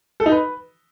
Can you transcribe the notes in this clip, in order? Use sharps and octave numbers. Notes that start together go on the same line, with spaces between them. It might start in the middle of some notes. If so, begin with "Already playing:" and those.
A4
D#4
B4